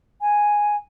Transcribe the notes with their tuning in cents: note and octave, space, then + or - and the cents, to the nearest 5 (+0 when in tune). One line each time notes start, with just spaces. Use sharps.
G#5 +0